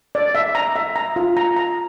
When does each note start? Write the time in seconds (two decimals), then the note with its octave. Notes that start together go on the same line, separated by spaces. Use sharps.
0.15 D5
0.35 E5
0.55 A#5
0.76 E5
0.96 A#5
1.16 F4
1.37 A#5
1.57 A#5